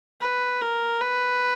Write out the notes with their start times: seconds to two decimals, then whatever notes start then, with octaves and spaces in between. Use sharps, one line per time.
0.21 B4
0.61 A#4
1.01 B4